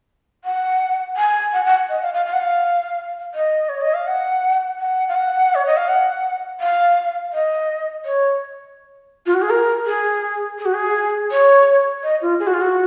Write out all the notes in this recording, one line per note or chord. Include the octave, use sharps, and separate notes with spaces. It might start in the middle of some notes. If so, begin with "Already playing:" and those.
F#5
G#5
F#5
F#5
D#5
F5
F5
F5
F#5
F5
D#5
C#5
D#5
F5
F#5
F#5
F5
F#5
C#5
D#5
F5
F#5
F5
D#5
C#5
F4
F#4
G#4
A#4
G#4
G#4
F#4
G#4
C#5
D#5
F4
G#4
F#4
F4
F#4